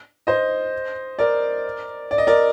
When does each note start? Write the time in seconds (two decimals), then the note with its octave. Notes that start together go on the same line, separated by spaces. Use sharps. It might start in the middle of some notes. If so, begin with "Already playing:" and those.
0.27 C5 D#5
1.19 A#4 D5
2.11 D5
2.18 D#5
2.27 A#4 D5